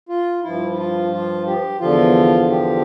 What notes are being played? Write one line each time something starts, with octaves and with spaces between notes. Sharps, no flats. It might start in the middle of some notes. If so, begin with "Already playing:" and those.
F4
G2 F3 E4
E4
F4
F4
G4
E2 D3 F3 F4
G4